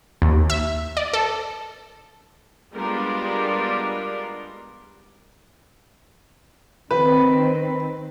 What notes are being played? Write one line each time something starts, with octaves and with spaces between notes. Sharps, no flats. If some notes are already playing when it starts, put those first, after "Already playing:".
D#2
E5
D5
A4
G3 G#3 B3 D4 F4 A#4
D#3 C4 B4